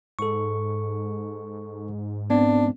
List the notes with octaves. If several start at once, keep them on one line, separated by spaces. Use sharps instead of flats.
G#2 A4 C#6
B3 C4 D4